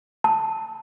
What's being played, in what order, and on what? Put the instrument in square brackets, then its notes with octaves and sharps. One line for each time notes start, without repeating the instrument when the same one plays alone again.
[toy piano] A5